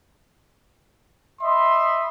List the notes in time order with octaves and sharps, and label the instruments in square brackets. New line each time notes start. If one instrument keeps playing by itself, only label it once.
[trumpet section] D#5 E5 B5 C6